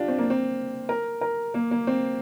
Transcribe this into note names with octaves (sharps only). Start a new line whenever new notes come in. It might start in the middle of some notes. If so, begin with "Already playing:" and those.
Already playing: D4 F4 G4
C4
A#3
C4
A#4
A#4
A#3
A#3
C4